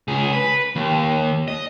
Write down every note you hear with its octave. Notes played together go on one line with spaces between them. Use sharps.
C#2 G#4
B4
D#2
D#5